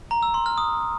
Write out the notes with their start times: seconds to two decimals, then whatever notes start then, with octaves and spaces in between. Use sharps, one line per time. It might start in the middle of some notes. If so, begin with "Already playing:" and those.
0.11 A#5
0.23 E6
0.34 C6
0.46 F6
0.58 D#6